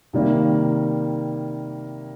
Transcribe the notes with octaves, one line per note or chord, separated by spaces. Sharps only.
C3 D#3 G3 A#3